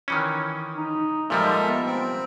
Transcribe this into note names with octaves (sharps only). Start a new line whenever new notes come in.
D#3 E3 C#4
D#4
A#2 F3 G3 G#3 A4 A#4 E5
B3
C4